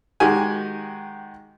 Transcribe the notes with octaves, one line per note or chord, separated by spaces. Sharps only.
D#3 G#3 F#4 G4 G#5